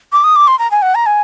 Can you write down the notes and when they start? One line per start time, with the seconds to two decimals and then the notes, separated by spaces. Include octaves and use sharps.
0.12 D6
0.24 D#6
0.36 D6
0.48 C6
0.59 A#5
0.71 G#5
0.82 F#5
0.95 A#5
1.06 G#5